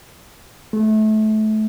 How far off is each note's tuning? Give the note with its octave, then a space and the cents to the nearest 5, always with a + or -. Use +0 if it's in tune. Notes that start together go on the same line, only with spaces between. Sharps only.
A3 -25